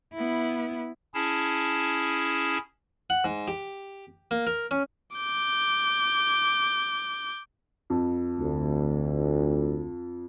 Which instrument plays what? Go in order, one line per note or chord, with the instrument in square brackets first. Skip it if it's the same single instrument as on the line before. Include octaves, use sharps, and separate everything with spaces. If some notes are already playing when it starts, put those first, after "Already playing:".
[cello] B3 E4
[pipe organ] C#4 E4 G#4 A5
[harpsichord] F#5
G#2
G4
A#3
A#4
C#4
[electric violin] D6 G6
[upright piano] F2
[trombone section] D2